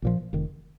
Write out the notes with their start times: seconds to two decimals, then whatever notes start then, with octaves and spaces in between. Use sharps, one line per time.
0.02 A#1 A#2 F3
0.33 F1 F2 D#3